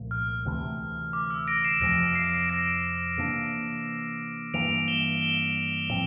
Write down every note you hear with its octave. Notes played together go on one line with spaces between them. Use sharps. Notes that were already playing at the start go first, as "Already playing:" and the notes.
Already playing: C2 A#2 F3 A3
F6
D2 C3 E3 A3
D6
E6
A#6 D7
C7 E7
F2 C3 F3 A#6 D7
C7
A#6 D7
C3 E3 A#3 D4
G2 E3 A#3 D7 F7
E7 G7
E7 G7
A2 F3 C4